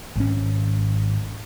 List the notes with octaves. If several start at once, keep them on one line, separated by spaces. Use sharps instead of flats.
G#1 C#4